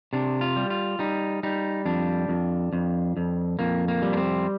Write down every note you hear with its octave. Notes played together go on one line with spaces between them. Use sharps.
C3 D4
F4
G3
F4
G3 D#4
G3 D#4
F2 D4
F2
F2
F2
F2 A#3
A#3
G3
D4
C4